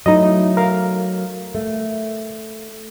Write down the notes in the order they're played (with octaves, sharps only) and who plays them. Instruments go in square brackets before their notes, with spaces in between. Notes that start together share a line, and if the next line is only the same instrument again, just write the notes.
[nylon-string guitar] F#3 A3 [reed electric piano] D#4 E4 D#5
[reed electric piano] A#4 F5
[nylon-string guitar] A3